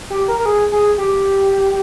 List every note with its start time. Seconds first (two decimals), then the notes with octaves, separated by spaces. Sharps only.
0.10 G4
0.28 A#4
0.39 A#4
0.46 G#4
0.72 G#4
0.98 G4